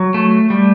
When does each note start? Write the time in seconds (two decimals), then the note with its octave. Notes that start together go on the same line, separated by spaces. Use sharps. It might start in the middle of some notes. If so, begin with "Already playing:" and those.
Already playing: F#3
0.14 A3
0.50 G3